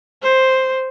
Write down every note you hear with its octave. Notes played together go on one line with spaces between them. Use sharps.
C5